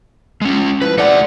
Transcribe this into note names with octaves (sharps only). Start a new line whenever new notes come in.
G#3 C#4
F3 E4 B4
A3 F4 G4 D5 F#5